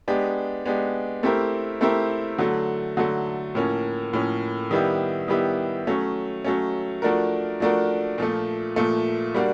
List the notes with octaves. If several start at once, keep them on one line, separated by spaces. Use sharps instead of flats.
G#3 B3 D4 G4
G#3 B3 D4 G4
A3 C4 E4 G4 A#4
A3 C4 E4 G4 A#4
D3 F#3 A3
D3 F#3 A3
A2 F3 A#3 C#4
A2 F3 A#3 C#4
D#3 G3 B3 E4 G4
D#3 G3 B3 E4 G4
F#3 A3 C#4
F#3 A3 C#4
F3 A3 D4 F#4 A#4
F3 A3 D4 F#4 A#4
A#2 F3 A3
A#2 F3 A3
G3 A#3 D4 F#4